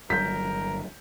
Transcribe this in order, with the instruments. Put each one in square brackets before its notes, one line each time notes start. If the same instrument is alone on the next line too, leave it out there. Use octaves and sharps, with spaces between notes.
[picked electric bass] G1 G2 F#3 [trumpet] A#4 [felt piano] G6 B6